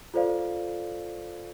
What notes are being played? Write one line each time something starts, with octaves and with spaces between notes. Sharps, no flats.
F4 A4 C5 D5 F5